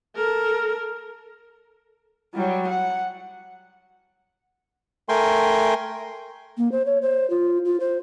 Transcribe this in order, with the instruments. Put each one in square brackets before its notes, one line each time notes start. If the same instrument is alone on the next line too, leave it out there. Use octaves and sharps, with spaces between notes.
[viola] A4 A#4
[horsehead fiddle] F#3 G3
F#5
[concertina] A3 A#4 G5 G#5 C6
[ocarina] A#3
C5
C#5
C5
F4
F4
C5